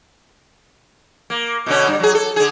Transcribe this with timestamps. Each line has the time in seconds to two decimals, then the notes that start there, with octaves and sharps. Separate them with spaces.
1.30 A#3
1.66 B2 D3 C#4
1.88 G2
2.00 F#3 G#4
2.15 A4
2.36 D3 G#4